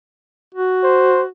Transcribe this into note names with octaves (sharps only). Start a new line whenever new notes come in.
F#4
C5